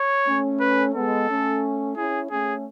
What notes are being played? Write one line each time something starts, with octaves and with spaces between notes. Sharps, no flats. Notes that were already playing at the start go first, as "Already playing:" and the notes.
Already playing: C#5
A3 C#4
B4
G#3 B3 A4
A3 C#4
C#4 E4 G#4
A3 C#4 G#4